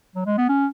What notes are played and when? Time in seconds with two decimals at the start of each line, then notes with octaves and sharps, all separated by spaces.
0.16 F#3
0.26 G#3
0.38 B3
0.49 C#4